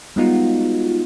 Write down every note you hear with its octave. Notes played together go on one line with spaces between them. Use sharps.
G3 G#3 B3 D#4 F4 F#4